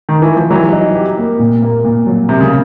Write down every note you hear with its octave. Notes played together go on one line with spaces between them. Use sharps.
D#3
E3
F3
E3 F#3 G3
D#4
G4
A#3
A#2
A#3
A#2
F#3
C3 A#3
C#3